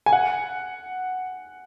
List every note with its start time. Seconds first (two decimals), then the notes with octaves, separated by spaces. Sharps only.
0.06 G#5
0.13 F#5